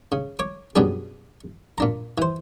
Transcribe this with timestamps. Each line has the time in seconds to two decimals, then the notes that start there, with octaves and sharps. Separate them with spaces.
0.12 C#3
0.39 C#5 D6
0.76 F#2 B2 G3 D4 G#4
1.78 A#2 D4 A#5
2.18 E3 C5